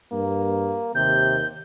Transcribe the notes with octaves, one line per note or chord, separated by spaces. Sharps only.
G2 A#3
D#2 C3 G6